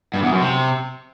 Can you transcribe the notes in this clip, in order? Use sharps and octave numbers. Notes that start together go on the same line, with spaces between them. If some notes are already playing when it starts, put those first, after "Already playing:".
G2
E2
F#2
C3